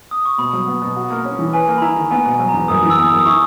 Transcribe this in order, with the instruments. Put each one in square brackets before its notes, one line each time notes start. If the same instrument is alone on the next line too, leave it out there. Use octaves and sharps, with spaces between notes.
[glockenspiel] D#6
C#6
[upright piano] B2 [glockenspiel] B5
[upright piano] F#3
B3
B2
F#4
A#3
C#4
E3
[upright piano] B4 [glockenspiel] G#5
[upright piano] A#3
[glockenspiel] B5
[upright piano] E4 [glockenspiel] A#5
[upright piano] D#3
[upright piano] B3 [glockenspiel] G#5
[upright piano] B2 [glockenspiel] G#5
[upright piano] F#3
[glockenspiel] A#5
[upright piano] E2
[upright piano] F#2 [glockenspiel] D#6
[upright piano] E3
[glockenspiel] E6
[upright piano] B3 [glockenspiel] D#6
[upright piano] F#2
[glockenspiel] D#6
[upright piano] E4 [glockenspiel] C#6